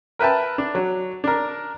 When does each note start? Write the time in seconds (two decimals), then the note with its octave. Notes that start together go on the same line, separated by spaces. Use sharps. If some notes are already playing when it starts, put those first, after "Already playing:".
0.19 A#4 B4 E5 G5 A5
0.58 D4
0.75 F#3
1.24 D4 A#4